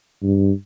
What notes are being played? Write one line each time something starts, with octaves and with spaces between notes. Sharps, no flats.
G2